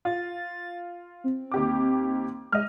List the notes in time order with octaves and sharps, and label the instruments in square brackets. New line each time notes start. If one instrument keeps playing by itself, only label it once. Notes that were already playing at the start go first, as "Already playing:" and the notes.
[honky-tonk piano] F4 [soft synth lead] A6
[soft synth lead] C4
[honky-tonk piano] D#2 G4 D6
[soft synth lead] G#3 [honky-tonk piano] D#5 F6